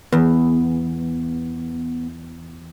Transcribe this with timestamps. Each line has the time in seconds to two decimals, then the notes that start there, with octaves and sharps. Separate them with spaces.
0.12 E2 B3